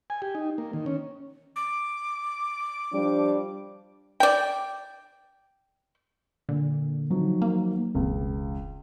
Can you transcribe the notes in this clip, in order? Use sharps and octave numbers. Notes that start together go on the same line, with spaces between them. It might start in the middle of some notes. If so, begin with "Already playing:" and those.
G#5
G4
D#4
A#3
D#3
C#4
D6
F3 G3 D4
D5 G5
A#2 D3
D#3 F3 F#3
A#3
E1 C#2